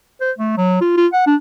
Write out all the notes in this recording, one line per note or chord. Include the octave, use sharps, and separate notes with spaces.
C5
A3
F#3
F4
F4
F#5
D4